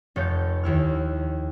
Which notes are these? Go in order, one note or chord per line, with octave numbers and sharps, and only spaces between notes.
F1 A4 C#5 F5 G6
D#2 E4 F6